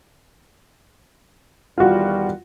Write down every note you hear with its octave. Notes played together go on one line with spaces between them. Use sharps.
E2 D#3 G3 F4 F#4